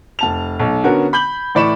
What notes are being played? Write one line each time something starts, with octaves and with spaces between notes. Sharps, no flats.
F1 A5 F7
B1
D3 B3 C#4 F#4 A#4
B5 G6 F#7
A2 E3 D5 B5 C#6 E7